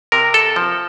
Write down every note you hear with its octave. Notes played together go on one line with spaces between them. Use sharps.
C3 A#4
A4
F3